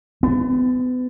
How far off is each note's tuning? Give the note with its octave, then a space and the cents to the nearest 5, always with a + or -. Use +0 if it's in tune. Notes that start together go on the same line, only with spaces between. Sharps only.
B3 +35